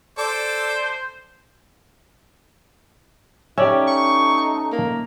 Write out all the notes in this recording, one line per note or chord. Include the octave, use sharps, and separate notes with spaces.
A4 C5 D5 D6
A3 C#4 D#4 G4 D5 E5
C#6
A#3